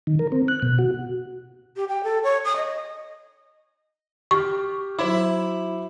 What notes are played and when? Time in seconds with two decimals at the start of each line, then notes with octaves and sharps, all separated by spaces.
0.07 D#3
0.19 A#4
0.32 C4
0.48 F#6
0.62 B2
0.79 F#4
1.76 G4
1.88 G5
2.04 A4
2.23 C#5
2.45 D#6
2.56 D#5
4.31 G4 C#6 F6
4.99 F#3 E4 C5 D6